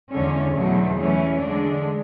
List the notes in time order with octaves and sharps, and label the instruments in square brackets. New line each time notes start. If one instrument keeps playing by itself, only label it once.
[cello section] E2 D3 G#3 C#4
E2 B2 F#3 A3
E3 A3 C#4
D3 G#3 D4